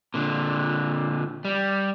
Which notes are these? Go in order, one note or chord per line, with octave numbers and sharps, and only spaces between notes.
A#2 D3
G3